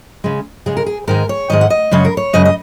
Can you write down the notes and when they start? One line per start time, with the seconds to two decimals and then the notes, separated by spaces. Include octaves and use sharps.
0.24 C#3 G#3
0.66 C#3 G#3 G#4
0.77 A#4
0.86 G#4
1.07 G#2 D#3 G#3 A#4
1.29 C#5
1.50 G#2 D#3 G#3 D#5
1.61 F#5
1.70 D#5
1.91 F#2 C#3 G#3 C#5
2.05 A#4
2.17 C#5
2.33 F#2 C#3 G#3 D#5
2.45 D#5